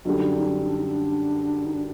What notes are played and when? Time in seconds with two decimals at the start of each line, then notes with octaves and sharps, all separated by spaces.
0.05 F#2 D3 G3 D4
0.16 D#4
0.26 D4
0.36 D#4
0.46 D4
0.56 D#4
0.66 D4
0.77 D#4
0.87 D4
1.66 D#4
1.74 D4